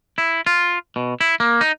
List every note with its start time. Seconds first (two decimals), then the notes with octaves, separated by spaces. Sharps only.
0.18 E4
0.46 F4
0.96 B2
1.21 E4
1.40 A#3
1.61 D#4